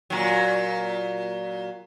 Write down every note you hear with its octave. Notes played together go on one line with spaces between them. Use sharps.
A#2 F#3